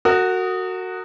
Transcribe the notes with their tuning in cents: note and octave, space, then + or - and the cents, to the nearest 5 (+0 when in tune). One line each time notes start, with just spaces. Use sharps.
F#4 +0 A#4 -40 D#6 +0